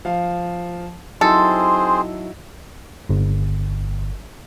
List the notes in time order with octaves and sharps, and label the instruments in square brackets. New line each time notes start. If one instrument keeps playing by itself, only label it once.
[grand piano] F3 F5
[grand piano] F#3 D#4 E4 [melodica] C4 G#4 C5 [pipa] A4 [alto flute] C6
[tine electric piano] G1